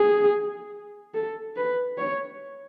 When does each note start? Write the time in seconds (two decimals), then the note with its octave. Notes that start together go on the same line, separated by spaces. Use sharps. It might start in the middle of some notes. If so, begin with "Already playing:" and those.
Already playing: G#4
1.14 A4
1.56 B4
1.98 C#5